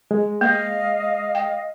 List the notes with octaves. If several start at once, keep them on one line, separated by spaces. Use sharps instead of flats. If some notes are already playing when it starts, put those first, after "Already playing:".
G#3
A#3 D#5 F5
G5